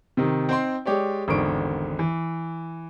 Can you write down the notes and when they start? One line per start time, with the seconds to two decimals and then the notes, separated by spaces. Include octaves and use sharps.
0.17 C3 D#3
0.49 C4 D#4 G5 C6
0.86 G#3 G4 C#5 D5
1.28 G#1 E2 D3 D#3 C#6 D7
1.99 E3